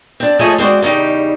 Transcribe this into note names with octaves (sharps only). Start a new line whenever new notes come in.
C4 D4
F3 A3 G#4 A4 C#5 D#5
G#3 C4 F#4 D5
E2 C#3 G3 D#4 G5